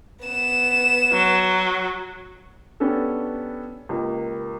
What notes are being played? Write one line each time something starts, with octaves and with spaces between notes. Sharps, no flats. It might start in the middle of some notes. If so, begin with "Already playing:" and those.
B3 E7
F#3
B3 C#4 D4 G4 A4
C#2 A#3 G4